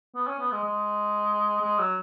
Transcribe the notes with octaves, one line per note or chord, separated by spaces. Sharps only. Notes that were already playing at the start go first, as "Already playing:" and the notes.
B3
C#4
B3
G#3
G#3
G#3
F#3